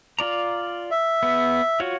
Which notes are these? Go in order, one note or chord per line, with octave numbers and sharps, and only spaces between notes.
F4 D5 A#5
E5
B3
F4 F#4 C#5